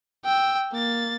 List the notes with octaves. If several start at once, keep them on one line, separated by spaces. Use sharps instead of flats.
G5 E6
A#3 A6